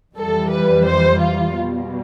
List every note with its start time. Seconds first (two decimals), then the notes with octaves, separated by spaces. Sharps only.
0.16 F2 E3 G3 A4
0.50 B4
0.85 C5
1.20 F4
1.54 B2 G3